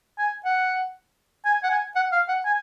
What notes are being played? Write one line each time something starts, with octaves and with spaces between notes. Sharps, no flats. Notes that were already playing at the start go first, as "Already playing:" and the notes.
G#5
F#5
G#5
F#5
G#5
F#5
F5
F#5
G#5